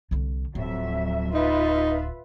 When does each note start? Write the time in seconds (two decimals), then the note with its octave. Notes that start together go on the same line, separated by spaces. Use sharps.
0.11 C2 D3
0.55 D1 F2 F#3 E5
1.34 D#4 F4 B4 E5